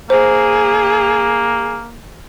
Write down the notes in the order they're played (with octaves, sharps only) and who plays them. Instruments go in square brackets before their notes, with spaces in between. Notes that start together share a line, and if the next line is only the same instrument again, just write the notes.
[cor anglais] A#3 [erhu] G#4 [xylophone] C5